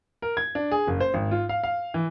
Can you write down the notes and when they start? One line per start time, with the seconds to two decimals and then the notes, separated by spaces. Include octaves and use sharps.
0.22 A#4
0.37 G#6
0.55 D4
0.72 G#4
0.87 F#1
1.00 C5
1.14 G#1
1.31 F4
1.49 F5
1.64 F5
1.94 E3